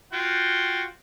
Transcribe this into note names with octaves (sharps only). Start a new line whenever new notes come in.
F4 F#4 G5